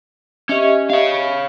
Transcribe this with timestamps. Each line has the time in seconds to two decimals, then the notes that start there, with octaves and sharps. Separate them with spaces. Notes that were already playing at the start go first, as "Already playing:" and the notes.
0.49 C#4 G4 D#5 E5
0.90 C#5 F5